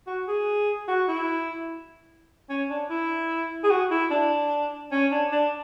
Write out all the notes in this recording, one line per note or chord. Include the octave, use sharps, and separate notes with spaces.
F#4
G#4
F#4
E4
C#4
D4
E4
G#4
F#4
E4
D4
C#4
D4
D4